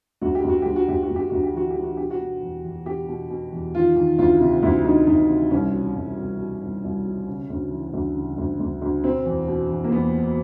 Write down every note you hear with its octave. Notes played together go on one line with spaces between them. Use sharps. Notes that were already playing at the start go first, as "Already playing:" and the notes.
D2 F#4
G4
D2 F#4
D2 G4
F#4
D2 G4
F#4
D2
G4
D2 F#4
G4
E3 F#4
G4
E3
F#4
B2 G4
F#4
B2
E2
E2
B2 G4
B2
B2
E2
D#3 F4
D#3
D2 F4
C3
D2 E4
D2 D#4
D2 D#4
C3
C2 C#4
B2
C2
C2
B2
C2
C2
B2
C#3
D2
E3
D2
C#3
D2
D2
D2
B2 C4
E2
B2
E2
A#3
E2 B3
B2